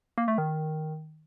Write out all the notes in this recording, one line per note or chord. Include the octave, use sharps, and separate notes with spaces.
A#3
A3
D#3